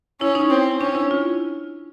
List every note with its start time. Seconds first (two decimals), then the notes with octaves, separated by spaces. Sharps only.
0.20 C#4 E4
0.35 D#4
0.50 C4
0.80 C#4 D4
0.95 E4
1.11 F4